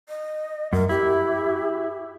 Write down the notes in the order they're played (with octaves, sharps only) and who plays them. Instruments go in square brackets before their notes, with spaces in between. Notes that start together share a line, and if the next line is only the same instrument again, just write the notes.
[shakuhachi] D#5
[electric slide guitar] F#2 [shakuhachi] A#4
[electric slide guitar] E4 [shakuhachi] G4